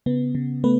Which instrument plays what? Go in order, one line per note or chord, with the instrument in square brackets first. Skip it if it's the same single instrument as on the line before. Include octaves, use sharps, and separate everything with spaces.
[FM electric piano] C#3 B3
C#3
A3 B3 B4